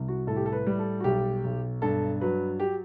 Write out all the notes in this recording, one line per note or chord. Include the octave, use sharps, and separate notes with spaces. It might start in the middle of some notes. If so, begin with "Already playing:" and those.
Already playing: C2
F#4
A2 A4
G4
A4
B4
G3
A4
F#4
B1 G4
B1
G2 A4
F#3 B4
G4